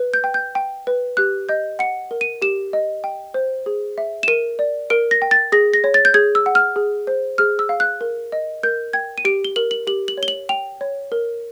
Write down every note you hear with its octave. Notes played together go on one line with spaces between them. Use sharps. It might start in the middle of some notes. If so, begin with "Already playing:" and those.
Already playing: B4
G6
G5
G6
G5
B4
G4 F#6
D#5 G6
F#5 C#7
A#4
D#7
G4 E7
D#5
G5
C5
G#4
E5
E7
A#4 D#7
D5
A#4 D7
A#6
G5
A6
G#4 A#6
A#6
C#5
A6
G6
G#4 G#6
E6
F#5
F6
G#4
C5
G#4 F6
E6
F5
F#6
A#4
D#5
A#4 G6
G5 G#6
D#7
G4 D7
G7
A#4 F#7
F#7
G4 F#7
F#7
C#5
G7
F#7
G5 F7
C#5
A#4